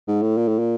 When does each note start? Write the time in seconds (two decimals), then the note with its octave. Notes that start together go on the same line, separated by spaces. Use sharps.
0.08 G#2
0.22 A2
0.37 A#2
0.48 A2
0.59 A#2